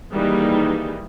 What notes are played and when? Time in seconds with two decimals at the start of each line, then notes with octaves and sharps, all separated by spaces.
0.12 D#3 E3 G3 G#3 A#3 D#4